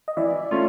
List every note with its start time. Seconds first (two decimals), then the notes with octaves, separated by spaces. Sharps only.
0.08 D#5
0.17 E3 D5 E5
0.51 A3 C#4 F4